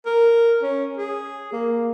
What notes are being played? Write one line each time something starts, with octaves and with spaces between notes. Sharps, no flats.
A#4
C#4
G#4
A#3